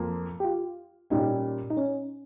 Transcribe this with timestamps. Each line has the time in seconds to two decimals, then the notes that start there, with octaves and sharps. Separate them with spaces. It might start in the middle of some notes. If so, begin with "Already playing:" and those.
Already playing: F2 A#3 F4
0.40 G4
0.44 F4
1.10 A#2 G3 C#4 D#4
1.70 D#4
1.77 C#4